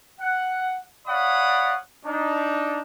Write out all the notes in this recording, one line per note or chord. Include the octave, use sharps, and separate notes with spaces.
F#5
C#5 D5 F5 F#5 B5 D#6
D4 D#4